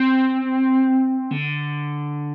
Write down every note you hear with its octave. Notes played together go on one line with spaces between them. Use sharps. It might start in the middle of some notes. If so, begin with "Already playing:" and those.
Already playing: C4
D3